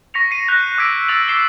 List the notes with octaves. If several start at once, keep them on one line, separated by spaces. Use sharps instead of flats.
C#6 A#6 B6 C#7 F7
C7 C#7 D#7
F#6 G6 A#6 F7
D6 E6 F#6 G#6 B6 D7
E6 A6 F7 F#7
D6 C7 C#7 E7 F#7 G7